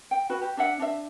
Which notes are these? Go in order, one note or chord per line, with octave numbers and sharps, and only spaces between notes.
G5
F#4 B4
G4
D4 E5 F#5
D4 E5